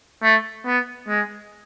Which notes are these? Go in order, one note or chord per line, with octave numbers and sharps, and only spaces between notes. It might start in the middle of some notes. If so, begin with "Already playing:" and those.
A3
B3
G#3